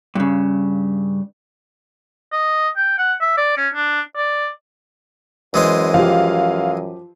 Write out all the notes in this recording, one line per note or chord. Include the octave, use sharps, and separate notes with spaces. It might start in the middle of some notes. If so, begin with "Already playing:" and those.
G2 C#3
D#5
G5
F#5
E5
D5
C#4
D4
D5
F#2 E3 G#3 C5
F3 G4 F5